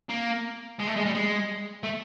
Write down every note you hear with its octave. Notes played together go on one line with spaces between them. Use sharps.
A#3
G#3
A3
G#3
G3
G#3
A3